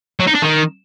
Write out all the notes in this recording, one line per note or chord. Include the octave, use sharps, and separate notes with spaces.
F#3
D#4
D4
D#3